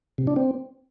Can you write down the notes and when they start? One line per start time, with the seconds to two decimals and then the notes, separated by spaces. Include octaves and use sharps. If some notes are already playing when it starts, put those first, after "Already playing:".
0.18 C3
0.27 D4
0.36 C4